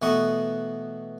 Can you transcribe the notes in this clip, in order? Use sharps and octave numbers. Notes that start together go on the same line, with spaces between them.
B2 E3 A3 F#5 C#6 D#6